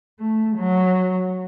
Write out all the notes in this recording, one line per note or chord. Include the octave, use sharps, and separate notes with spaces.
A3
F#3